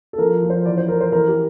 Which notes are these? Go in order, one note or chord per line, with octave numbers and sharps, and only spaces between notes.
A4
F3 A#4
F3
C5
E3 D5
C5
E3 A#4
C5
E3 A#4
G4